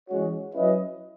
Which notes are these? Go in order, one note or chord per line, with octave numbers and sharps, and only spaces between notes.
E3 G#3 C#4 F#4 C#5
F#3 C#4 E4 B4 D#5